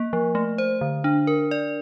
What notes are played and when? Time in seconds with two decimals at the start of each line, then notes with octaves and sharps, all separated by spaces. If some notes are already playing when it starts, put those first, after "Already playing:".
Already playing: A#3
0.13 F3
0.35 A3
0.58 C5
0.81 D3
1.04 D4
1.27 A#4
1.51 D5